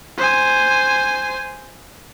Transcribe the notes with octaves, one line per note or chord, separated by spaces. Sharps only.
C5 G#5